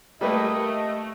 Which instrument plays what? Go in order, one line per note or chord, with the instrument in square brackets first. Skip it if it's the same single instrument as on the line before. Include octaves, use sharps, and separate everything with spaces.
[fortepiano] G3 A#3 B4 [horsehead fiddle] A3 [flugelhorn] D#5